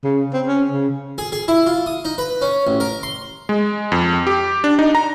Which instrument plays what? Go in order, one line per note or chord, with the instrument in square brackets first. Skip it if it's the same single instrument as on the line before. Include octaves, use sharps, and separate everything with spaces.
[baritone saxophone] C#3
C4
C#4
C#3
[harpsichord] G#4
G#4
E4
F4
D#6
D#4
B4
C#4
A1
A#4
C6
[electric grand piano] G#3
F2
G4
D4
D#4
A#5